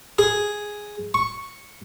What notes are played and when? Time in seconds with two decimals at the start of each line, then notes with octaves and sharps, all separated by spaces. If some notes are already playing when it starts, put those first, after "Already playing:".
0.19 G#4
1.14 C#6